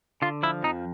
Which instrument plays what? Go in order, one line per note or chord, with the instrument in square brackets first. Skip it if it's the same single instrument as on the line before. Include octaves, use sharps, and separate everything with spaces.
[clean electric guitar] D3 F4
F3 E4
F2 D#4